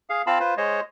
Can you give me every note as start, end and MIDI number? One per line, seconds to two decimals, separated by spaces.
0.10 0.22 68
0.10 0.22 77
0.27 0.39 60
0.27 0.39 65
0.27 0.39 77
0.27 0.39 81
0.27 0.39 83
0.40 0.54 65
0.40 0.54 71
0.40 0.54 72
0.58 0.80 56
0.58 0.80 72
0.58 0.80 73
0.58 0.80 75